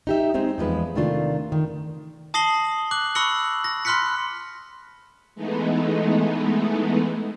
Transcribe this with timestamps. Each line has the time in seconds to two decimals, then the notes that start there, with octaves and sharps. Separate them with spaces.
0.07 D#4 G4 E5
0.34 G#3 C4 D#4
0.58 E2 F3 G#3 B4
0.95 C3 D#3 A3 D4 F4
1.52 D#3
2.34 A5 D#6 A#6 C7 F#7 G7
2.91 D6 F#6 F#7
3.15 B5 C#6 E6 A#6 C#7 F#7
3.64 A#6
3.85 B5 C6 F6 F#6 B6 C#7
5.35 E3 G#3 A3 B3 D#4